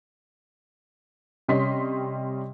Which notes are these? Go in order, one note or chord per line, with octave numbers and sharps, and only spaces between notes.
C3 G3 C#4 D#5 C6 B6